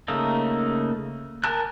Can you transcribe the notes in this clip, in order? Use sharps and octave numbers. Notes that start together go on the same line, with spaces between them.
C#3 A3 A#3 D#4
A#4 G#5 A5 F#6